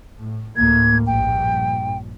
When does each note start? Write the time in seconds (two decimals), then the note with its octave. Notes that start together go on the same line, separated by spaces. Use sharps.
0.20 A2
0.56 D2 A2 A#3 G#6
1.07 A#1 G2 G5